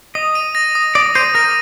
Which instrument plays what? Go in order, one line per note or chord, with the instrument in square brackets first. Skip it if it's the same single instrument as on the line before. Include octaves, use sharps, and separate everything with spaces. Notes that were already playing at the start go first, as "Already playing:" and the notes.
[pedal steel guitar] D#5 [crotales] D#6
[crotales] D#7
A#6
D#6
[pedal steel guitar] D5 [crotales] D#6
[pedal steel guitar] C5 [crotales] D#7
[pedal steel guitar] A#4 [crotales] A#6